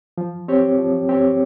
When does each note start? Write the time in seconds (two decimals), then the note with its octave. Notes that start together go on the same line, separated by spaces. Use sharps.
0.18 F3
0.48 C4 G4 C#5
0.78 F3
1.09 C4 G4 C#5